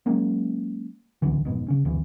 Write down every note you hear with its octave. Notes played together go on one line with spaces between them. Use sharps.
F#3 G#3 A#3 C#4
D1 C2 D3 E3
F1 G#2 B2
C#3 C#4
G1 D2 E3